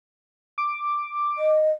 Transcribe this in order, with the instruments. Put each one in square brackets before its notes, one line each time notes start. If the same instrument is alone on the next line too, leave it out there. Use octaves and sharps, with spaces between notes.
[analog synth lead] D6
[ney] D#5